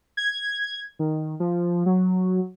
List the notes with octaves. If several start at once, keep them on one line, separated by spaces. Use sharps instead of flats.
G#6
D#3
F3
F#3